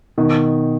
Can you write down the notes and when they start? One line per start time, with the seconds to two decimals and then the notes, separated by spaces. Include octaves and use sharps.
0.18 B2 D#3